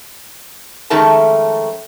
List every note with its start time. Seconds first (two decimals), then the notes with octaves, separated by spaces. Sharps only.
0.90 F2 D#3 G#3 A3 C#4 A5